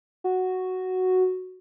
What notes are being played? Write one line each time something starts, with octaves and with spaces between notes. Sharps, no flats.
F#4